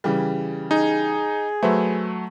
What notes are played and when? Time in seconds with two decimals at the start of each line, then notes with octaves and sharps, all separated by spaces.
0.04 C#3 E3 G3
0.71 D#4 G#4
1.63 F#3 A3 B4 C5 E5